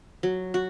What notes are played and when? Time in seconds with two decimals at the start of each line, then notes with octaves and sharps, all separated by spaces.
0.23 F#3
0.54 F#4